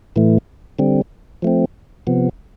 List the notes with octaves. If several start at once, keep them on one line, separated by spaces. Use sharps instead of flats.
A2 E3 A3
D3 G3 C4
F3 A3 C4
C3 F3 B3